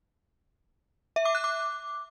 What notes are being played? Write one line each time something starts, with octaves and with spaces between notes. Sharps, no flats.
E5
D6
F#6
D6